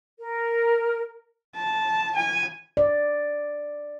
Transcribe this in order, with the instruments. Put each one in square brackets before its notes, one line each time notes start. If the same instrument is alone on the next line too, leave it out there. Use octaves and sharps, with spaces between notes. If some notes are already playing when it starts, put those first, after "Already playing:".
[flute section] A#4
[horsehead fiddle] A5
G#5
[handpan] D5